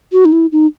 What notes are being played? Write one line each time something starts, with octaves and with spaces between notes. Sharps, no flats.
F#4
D#4
E4
D#4